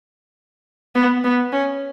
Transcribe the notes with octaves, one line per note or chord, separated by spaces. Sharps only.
B3
B3
C#4